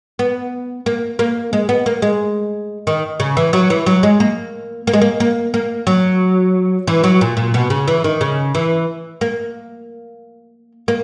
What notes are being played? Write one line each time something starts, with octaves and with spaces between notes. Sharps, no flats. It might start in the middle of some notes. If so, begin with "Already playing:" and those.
B3
A#3
A#3
G#3
B3
A#3
G#3
D#3
C#3
E3
F#3
E3
F#3
G#3
A#3
A#3
G#3
A#3
A#3
A#3
F#3
E3
F#3
A#2
A#2
B2
C#3
E3
D#3
C#3
E3
A#3
A#3